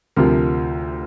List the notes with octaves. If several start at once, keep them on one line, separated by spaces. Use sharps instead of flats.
D2 C3 F3 A#4